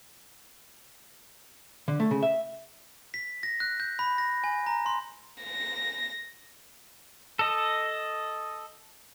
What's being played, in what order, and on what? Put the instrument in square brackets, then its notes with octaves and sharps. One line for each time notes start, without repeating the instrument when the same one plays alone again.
[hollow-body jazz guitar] D3
A3
C#3
E5
[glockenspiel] B6
A#6
F#6
G6
B5
A#6
G#5
A#5
C6
[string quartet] A#6
[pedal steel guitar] A4 D#5